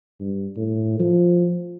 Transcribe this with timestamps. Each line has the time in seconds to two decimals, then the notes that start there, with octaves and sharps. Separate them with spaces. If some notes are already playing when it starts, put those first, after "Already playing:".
0.20 G2
0.57 A2
0.99 F3